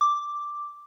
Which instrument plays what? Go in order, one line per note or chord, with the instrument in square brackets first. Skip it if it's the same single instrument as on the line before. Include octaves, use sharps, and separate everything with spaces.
[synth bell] D6